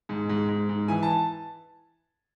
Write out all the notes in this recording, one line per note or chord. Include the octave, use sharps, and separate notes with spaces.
G#2
G#2
G#2
G#2
E3 G#5
A5